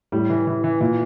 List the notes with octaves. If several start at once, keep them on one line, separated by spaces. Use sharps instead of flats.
A2 G3
E3
E3
E3
A#2 E3